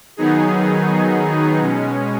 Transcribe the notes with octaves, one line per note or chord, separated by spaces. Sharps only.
D#3 F#3 B3 D#4 G#4
B2 G#3 C#4